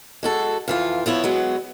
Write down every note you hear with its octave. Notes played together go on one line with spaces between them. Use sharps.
G#3 F#4 A4
F2 E3 F4
F3 B3 E4 C#5
F#3 G#3 B3